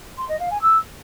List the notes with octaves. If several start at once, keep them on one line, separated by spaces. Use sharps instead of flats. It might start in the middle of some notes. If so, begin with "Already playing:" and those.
C6
D#5
F5
G#5
E6